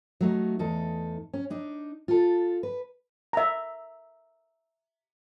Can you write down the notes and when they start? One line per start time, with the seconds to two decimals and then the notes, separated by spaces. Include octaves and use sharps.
0.21 F#3 A3 D#4
0.59 E2 D#4 A4
1.34 C#4
1.50 D4 D#4
2.08 F4 A4
2.63 B4
3.33 E5 A#5